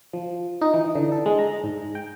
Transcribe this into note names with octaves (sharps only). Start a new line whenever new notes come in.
F3
D#4
E3
D3
A4
G#3
A#5
G#2
G5